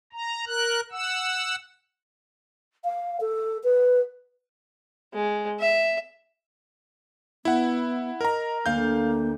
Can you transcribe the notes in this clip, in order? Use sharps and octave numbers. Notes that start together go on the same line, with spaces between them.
A#5
A#4 F#6
F#5 E6
F5
A4
B4
G#3
E5
B3 E4 F#5
A#4 D#5 A#5
D2 A#3 F5 G6